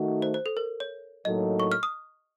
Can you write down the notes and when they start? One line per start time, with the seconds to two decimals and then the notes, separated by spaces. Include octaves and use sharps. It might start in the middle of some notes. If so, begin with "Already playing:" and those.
Already playing: D#3 A3 D#4 F#4
0.22 C5
0.34 C5
0.46 A4
0.57 A#4
0.80 C#5
1.25 A2 F#3 A#3 D#4 A4 D#5
1.60 C#6
1.72 F6
1.83 D#6